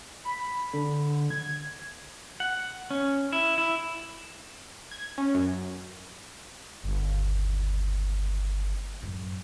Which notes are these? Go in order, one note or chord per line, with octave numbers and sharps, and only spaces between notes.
B5
D3
G#6
F#5
C#4
E4
E4
G#6
C#4
F#2
G1 D#2
A1 F#2